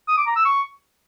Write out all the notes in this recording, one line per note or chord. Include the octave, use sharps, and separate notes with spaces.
D#6
D6
A#5
E6
C#6